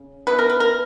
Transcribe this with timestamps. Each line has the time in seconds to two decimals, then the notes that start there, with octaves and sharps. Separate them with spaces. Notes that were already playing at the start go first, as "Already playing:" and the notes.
Already playing: C#3
0.27 E3 B3 B4
0.39 A#4
0.49 B4
0.60 A#4